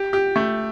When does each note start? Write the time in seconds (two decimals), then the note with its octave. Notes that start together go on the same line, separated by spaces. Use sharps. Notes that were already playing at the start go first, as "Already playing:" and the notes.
Already playing: G4
0.13 G4
0.36 A3